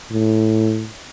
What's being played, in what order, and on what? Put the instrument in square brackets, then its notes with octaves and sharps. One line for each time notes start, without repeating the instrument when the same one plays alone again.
[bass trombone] A2